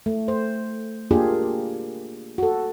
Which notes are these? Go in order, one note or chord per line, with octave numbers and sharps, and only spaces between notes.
A3
C5
A#3 D4 F4 G4 G#4
F#4 A4